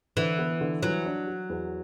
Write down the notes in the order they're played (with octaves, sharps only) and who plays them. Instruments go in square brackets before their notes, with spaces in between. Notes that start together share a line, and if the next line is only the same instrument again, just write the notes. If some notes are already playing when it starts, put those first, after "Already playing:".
[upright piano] D3 [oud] E3
[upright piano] B3
D3
[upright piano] E3 [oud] F#3
[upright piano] D4
F#4
E2